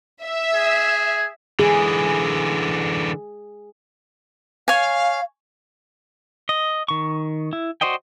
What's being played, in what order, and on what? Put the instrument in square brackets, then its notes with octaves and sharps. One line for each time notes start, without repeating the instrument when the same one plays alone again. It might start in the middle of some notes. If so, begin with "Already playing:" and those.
[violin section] E5
[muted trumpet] G#4
[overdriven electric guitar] D3 E3 [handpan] G#4
[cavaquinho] C#5 G#5 [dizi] F5
[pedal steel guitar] D#5
D#3 C#6
E4
F#4 C5 D5 D#5 G5